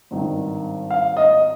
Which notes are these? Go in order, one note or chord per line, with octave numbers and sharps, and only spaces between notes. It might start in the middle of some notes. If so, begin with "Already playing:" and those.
G#1 G2 D#3
F5
D#5